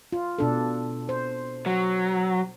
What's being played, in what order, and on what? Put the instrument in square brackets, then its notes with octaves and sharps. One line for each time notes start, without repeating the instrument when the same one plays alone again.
[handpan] F4
B2 D4 A4
C5
[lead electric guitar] F#3